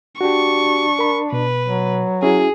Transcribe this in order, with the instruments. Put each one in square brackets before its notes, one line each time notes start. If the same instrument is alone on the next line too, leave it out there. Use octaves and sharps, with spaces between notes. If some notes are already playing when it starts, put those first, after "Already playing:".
[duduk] D4 [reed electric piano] F#4 G4 [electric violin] C#6
[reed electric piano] A#4 B5
[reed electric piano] B2 [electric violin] B4
[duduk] F#3
[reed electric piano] C#4 E4 F#4 [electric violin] G#4